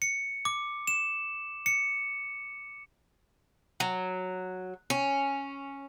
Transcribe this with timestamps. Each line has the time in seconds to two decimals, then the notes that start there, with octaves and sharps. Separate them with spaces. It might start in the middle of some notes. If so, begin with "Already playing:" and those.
0.02 C#7
0.45 D6
0.87 E7
1.66 C#7
3.80 F#3
4.90 C#4